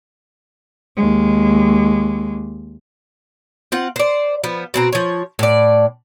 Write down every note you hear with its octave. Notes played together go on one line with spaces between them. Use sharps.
D#2 G#3
C4 F4 F#5
C5 D5
F3 B3
B2 C4 A#5
F3 C#5
A2 D5